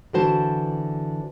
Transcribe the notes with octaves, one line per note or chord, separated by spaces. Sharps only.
D3 E3 F#4 C5 A5